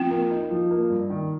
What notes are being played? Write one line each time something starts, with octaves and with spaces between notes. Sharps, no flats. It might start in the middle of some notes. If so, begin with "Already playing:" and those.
Already playing: F3 C4
A#3
D#4
F3
A#3
G2
D#3